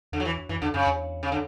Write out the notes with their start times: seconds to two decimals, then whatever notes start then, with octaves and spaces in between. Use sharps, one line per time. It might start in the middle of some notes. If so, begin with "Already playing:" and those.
0.12 E2 D3
0.20 F#3
0.25 E3
0.49 F#2 E3
0.62 E2 D3
0.74 F#2 C#3
0.86 E2
1.23 C#3
1.32 D3